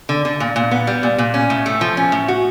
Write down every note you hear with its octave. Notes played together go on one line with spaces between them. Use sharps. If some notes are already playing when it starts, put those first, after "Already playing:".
D3
D3
A#2
A#2
B3
G3
A#2
A#2
C#4
A2
A3
F3
C#4
A2
F#4